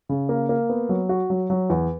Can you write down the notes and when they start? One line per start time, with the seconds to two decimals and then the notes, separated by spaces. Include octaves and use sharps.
0.09 C#3
0.29 A#3
0.49 A#3
0.69 B3
0.89 F#3
1.09 F#4
1.30 F#3
1.50 F#3
1.70 E2